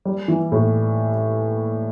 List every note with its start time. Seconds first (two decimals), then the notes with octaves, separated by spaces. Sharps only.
0.05 G3
0.28 E3
0.52 A2